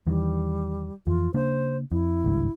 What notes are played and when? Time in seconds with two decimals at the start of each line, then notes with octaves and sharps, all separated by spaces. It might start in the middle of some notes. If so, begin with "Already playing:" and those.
0.07 E2 D#3 E3 G3
1.07 F2 E3 F4
1.34 C#3 A#3 D4 C5
1.92 F2 E4
2.24 G#1 C#2 G2